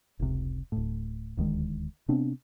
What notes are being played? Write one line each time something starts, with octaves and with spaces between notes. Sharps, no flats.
F1 C#2 C3
D1 A2
D#1 D2 D#3 G#3
C3 B3 C4 D4